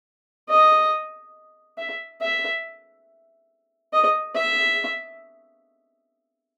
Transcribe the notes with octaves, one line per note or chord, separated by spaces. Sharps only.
D#5
E5
E5
D#5
E5